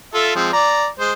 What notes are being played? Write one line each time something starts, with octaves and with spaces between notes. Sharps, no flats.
F4 A4 E5
F3 G#3 C4
D5 A#5
G#3 C5